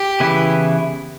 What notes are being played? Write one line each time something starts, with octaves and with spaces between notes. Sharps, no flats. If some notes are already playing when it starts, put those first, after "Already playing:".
Already playing: G4
C#3 E3 B3 E4